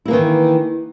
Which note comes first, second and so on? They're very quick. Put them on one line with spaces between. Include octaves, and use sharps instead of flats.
E4 A#3 E3 D#3